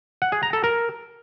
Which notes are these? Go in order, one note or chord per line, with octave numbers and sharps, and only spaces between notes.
F#5
G#4
A#5
A4
A#4